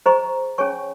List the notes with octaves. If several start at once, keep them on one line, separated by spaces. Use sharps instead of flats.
G#4 C5 D#5 A#5 C#6
C#4 G#4 C#5 G#5 C#6